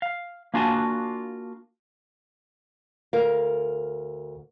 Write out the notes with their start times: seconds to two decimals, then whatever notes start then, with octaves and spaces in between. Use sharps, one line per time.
0.02 F5
0.54 A#3 D4 F4 F#4 G#5 A5
3.13 D2 A#4 F5